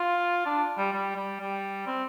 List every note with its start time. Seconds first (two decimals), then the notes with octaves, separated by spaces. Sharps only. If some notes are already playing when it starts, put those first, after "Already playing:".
Already playing: F4
0.46 D4
0.78 G3
0.93 G3
1.16 G3
1.40 G3
1.87 C4